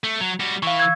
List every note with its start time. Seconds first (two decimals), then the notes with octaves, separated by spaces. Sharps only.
0.04 A3
0.20 F#3
0.40 G3 F#4
0.63 E3 F5 C#6
0.80 E6 G#6